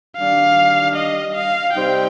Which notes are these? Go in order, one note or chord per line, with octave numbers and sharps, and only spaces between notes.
D#3 G3 D4 F5
D#5
F5
C3 G3 C4 D#4 G5